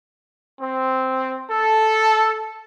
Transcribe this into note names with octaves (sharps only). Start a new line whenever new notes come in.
C4
A4